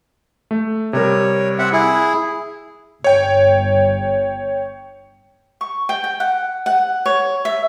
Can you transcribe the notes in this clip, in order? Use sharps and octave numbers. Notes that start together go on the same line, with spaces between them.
A3
C3 G3 A#4 C#5
C4 E5 F#5
E4 G#4
G1 C#5 G5
C#6
G5
G5
F#5
F#5
C#5
E5